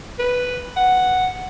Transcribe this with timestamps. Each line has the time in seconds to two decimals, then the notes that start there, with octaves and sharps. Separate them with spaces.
0.19 B4
0.77 F#5